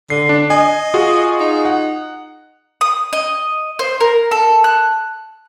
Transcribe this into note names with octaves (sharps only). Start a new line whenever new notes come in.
D3 C7
D4
D#5 G#5
F4 F#4 G#4
D#4
F#5
D#6
D#5
C5
A#4
A4
F#6